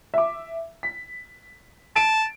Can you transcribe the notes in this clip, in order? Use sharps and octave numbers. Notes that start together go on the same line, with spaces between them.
E5 D6
B6
A5 D7